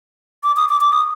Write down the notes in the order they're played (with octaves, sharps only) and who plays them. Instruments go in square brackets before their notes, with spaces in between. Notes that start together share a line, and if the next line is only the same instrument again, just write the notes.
[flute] D6
D#6
D6
D6
D#6